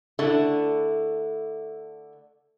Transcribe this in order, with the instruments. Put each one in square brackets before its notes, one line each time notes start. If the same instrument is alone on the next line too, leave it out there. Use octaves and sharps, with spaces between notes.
[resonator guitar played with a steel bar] D3 A3 D4 E4 A4